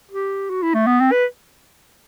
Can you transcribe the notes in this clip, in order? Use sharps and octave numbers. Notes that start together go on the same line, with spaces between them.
G4
F#4
E4
A3
B3
C4
B4